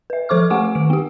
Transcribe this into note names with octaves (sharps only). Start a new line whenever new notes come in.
B4 E5
F3 A4 C5 C#6 D6 F6
A3 G4 F#5 G#5 C#6 D6
D#3 D7
B3 G4